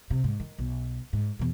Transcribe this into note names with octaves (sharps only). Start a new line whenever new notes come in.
C3
G#2
D#3
B1
G#2
E2 B2